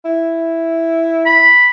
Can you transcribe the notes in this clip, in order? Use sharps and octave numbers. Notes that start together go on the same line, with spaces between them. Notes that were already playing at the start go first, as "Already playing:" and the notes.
E4
B5